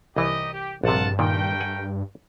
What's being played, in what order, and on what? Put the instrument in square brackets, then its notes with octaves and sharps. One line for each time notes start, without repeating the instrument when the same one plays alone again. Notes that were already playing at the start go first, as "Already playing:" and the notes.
[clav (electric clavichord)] C2 E3 [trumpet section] D#4 G4 D#5
[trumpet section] G4
[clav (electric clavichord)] A#1 C3 [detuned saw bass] G2 [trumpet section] F4 F#5 A5
[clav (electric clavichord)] A#2 D#3 [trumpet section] A3 A#4 G5
[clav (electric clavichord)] F#5 G#5